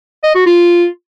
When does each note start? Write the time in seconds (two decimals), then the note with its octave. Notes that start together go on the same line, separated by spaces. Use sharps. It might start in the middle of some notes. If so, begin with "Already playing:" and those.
0.23 D#5
0.35 F#4
0.46 F4